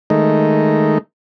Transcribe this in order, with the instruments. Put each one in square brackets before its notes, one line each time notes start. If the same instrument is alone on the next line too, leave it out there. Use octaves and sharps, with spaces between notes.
[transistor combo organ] D#3 G#3 A3 D#4